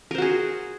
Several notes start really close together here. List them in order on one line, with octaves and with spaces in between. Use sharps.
A#4 C5 F#4 G#4